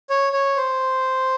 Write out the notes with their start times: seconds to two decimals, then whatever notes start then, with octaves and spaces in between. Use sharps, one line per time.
0.10 C#5
0.33 C#5
0.57 C5